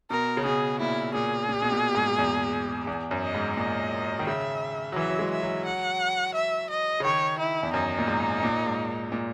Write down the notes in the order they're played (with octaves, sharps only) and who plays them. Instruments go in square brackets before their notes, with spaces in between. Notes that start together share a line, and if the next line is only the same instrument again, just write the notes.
[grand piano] B2 [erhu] A#4
[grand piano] C#3
[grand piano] B2 [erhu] G#4
[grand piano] A#2 [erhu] E4
[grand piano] A#2 [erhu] G#4
[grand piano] A#2
B2
A#2
G#2
E2
E2
F#2
[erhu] D#5
[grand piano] G#2
[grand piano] A#2 [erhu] D#5
[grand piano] D#3
[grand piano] C#3 [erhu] E5
[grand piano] F#3
[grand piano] E3 [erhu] E5
[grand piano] F#3
G#3
[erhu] E5
[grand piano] F#3
[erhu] F#5
E5
D#5
[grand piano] C#3
[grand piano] D#3 [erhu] C#5
[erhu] E4
[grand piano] E2
[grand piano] F#2 [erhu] D#4
[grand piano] A#2
G#2
A#2
G#2
A#2